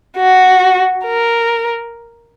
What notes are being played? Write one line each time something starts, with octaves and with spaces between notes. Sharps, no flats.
F#4
A#4